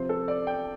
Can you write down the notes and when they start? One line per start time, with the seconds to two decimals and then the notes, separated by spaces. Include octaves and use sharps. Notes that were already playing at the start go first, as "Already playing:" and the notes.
Already playing: C3 F3 C4 C5
0.09 A4
0.28 D5
0.47 G5